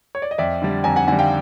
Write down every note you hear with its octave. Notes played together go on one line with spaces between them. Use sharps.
C#5
D5
D#5
F2 D5 E5
D3 G3
F2 G#5 A#5
F#5 G#5
D3 G3 F#5 G#5
F5 G5